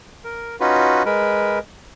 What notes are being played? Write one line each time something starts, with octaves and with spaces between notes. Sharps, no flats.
A#4
C#4 D#4 F4 F#4 B4
G#3 A#4 B4